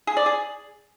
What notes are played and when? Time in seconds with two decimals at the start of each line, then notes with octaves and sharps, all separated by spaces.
0.07 G#4
0.17 D5
0.26 G#4